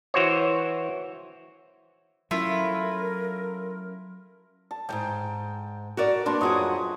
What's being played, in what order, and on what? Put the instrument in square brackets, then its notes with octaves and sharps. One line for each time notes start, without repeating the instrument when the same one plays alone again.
[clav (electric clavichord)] E3 F#4 C5 C#5
[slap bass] F#3 C#4 [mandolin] A3 E4 F4 [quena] A#4
[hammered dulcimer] A5
[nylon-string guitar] E2 G#2 [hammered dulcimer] G5
[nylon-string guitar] F#4 A#4 D5
[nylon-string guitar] A#3 D4 F#4 [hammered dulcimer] B4 A5 C6
[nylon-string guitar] F#2 F#4 G#4 [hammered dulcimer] F3 D#5 C#6